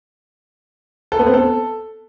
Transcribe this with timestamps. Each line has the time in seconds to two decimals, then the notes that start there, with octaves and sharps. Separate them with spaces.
1.12 A4
1.19 B3
1.26 C4
1.34 A4